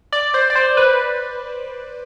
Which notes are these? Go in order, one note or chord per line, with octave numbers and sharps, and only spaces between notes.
D5
C5
D5
C5
B4